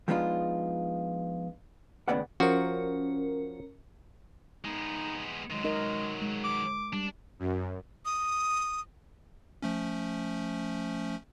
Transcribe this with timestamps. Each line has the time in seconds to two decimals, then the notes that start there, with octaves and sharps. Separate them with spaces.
0.08 F3 G#3 B3 D4 D#4 F4
2.08 D#2 A2 C#3 B3 D5 F#5
2.40 F3 C#4 F#4 A#4
4.65 G#3 B3 D#4
5.51 D#3 F#3 G#3
5.64 D#4 A#4 D#5
6.22 G#3
6.44 D6
6.93 G3 D4
7.39 F#2
8.05 D#6
9.62 F3 A3 C#4